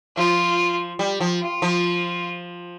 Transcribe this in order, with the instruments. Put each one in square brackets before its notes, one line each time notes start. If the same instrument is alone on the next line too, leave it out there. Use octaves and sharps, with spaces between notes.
[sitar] F3 [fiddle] F4
[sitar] G3
F3
[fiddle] F4
[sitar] F3